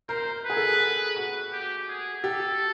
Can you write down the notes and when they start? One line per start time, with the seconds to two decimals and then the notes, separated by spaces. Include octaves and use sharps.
0.09 A#4 C5
0.45 G#4 B4
0.57 A4
0.80 G#4
1.16 F#4
1.52 G4
1.88 G#4
2.24 G4 A4